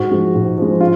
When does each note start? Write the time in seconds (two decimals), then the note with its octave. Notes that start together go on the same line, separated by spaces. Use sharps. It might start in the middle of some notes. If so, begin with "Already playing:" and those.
Already playing: G#2 F#4
0.11 F3 G#3
0.35 G#2
0.58 F3 G#3
0.81 F4